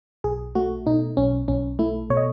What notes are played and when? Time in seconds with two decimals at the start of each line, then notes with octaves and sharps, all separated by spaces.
0.24 B1 G#4
0.55 A3 F#4
0.86 B2 D#4
1.17 B1 C#4
1.48 B1 C#4
1.79 A3 E4
2.10 B2 C#5
2.17 D#5